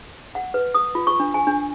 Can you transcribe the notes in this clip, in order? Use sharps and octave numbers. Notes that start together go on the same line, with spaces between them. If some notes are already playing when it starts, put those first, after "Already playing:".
F#5
B4
D#6
F4
C#6
D4
G#5
D4